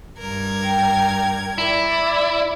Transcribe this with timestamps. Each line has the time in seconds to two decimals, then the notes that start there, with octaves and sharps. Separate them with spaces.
0.17 G2 A#4 G#6
0.64 G5
1.58 E4 D5